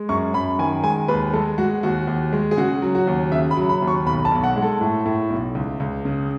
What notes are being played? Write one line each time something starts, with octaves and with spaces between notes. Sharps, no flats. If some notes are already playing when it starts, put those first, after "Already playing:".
Already playing: G#3
F#2 C#6
F#2 B5
D#3 G#5
G#3 G#5
D#2 B4
G#3 A4
G#3 F#4
D#2 F#4
D#2
G#3
G#4
C#3 F#4
F#3
F#4
D#2
C#3 E5
B5
F#3
B5
D#2
C#6
B1 B5
A5
B1
F#5
G#3
A4
A2
A2
B1
C#2
C#2
C#3